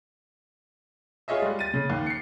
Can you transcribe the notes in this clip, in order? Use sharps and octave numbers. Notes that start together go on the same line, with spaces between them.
F4 G#4 C#5 D#5 E5
G3 G#3
A6 D#7
C#3
D#2
C7 C#7